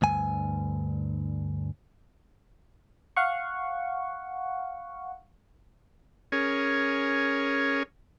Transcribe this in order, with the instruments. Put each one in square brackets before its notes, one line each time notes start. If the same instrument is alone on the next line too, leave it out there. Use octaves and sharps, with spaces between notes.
[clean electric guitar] D2 G2 G#5
[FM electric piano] F5 F#5 C#6
[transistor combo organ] C#4 G#4 A#4 C#5